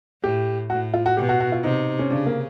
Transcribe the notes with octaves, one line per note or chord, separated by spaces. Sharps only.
A2 G4
A2 F#4
F4
F#4
B2 G4
F#4
F#4
F4
C3 D#4
C#4
C#3 D4
A#3